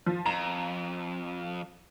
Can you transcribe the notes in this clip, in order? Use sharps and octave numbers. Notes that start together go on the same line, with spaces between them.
F3
F2 A#5